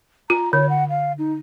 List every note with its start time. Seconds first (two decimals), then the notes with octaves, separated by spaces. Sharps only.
0.30 F4 A#5
0.53 D3 C#5
0.69 F#5
0.90 F5
1.18 D#4